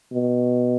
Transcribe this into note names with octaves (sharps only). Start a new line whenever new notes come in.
B2